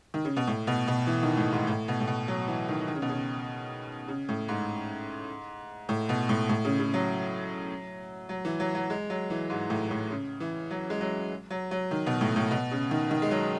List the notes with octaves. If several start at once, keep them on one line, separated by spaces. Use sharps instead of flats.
D#3
C#3
B2
A2
B2
B2
E3
D#3
A2
G#2
A2
B2
A2
B2
F#3
E3
D#3
D#3
C#3
B2
C#3
C#3
A2
G#2
A2
B2
A2
A2
C#3
C#3
F#3
F#3
E3
F#3
F#3
G#3
F#3
E3
G#2
A2
A2
C#3
E3
F#3
G#3
F#3
F#3
F#3
D#3
B2
A2
A2
B2
C#3
D#3
D#3
G#3
F#3